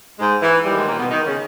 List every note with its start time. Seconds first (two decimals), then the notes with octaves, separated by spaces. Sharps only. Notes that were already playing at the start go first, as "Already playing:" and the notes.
0.19 G#2 G#3
0.42 E3
0.65 D#2 D#3 G3
0.77 G#2 G#3
0.88 A#2 A#3
0.99 B2 B3
1.11 D#3 D#4
1.26 C#3 C#4